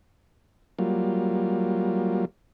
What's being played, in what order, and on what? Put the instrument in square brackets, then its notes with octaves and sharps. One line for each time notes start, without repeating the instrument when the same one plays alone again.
[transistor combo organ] F#3 G3 A#3 F4